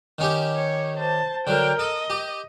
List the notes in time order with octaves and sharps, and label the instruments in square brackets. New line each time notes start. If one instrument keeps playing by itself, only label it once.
[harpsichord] D#3 C#4 G4
[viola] C#5
C5 A5
[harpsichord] D3 F#3 [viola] A#4 G5
[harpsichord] A4 [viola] D#5
[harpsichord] G4